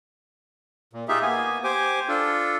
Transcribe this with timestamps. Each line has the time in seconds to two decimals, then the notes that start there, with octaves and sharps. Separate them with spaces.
0.93 A#2
1.08 D#4 F4 G4 G#4 E5
1.22 A#3 B3 G#5
1.64 G4 C5 G#5 D6
2.08 D4 F4 A4